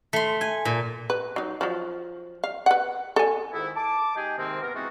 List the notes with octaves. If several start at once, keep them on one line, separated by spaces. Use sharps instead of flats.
A3 C6
G#5
A#2
B4
F#3 D#4
F3 F#3
F5
B4 F#5
A4 G#5
F2 G#2 D#3 B3 E4
A5 D6
G#3 D#4 G4 G#4 G5 G#5
G#2 C3 D#3 A#3 C4
B3 A#4
E3 G#3 C4 D#4 F4 F#4